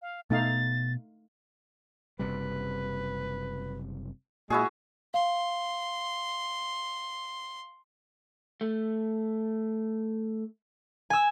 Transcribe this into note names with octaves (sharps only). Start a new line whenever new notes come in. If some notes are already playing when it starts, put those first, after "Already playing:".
F5
B2 A3 B3 D#4 F5 A6
F#1 C3 G3 B4
A#2 G#3 E4 F#4 G#4
F5 C6
A3
G#5 E6